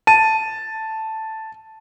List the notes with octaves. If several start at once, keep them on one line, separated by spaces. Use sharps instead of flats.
A5 D#7